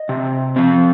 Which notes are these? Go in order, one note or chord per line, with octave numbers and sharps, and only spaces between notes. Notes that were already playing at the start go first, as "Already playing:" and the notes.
Already playing: D#5
C3
F3 C4